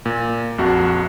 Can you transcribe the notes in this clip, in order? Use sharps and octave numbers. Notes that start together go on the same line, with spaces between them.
A#2
A#1 F2 F#4